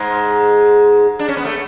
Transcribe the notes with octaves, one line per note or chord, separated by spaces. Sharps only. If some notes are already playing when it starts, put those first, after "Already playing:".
Already playing: G#2 G#3
D4
C#4
B3
A3